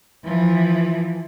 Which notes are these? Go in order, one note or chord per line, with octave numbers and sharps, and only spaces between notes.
E3 F3